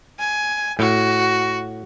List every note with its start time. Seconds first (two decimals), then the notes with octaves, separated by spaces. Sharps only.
0.19 G#5
0.79 A2 F#4